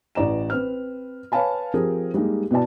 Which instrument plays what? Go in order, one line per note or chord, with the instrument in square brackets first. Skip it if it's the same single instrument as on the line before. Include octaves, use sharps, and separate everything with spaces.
[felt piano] A1 E3 D5 A#5 E7
C4 B4 F6
B4 C#5 F5 G#5 A5 B5
F3 C4 G4 G#4 A#4
G3 G#3 A#3 D#4
B2 B3 E4 D5 A5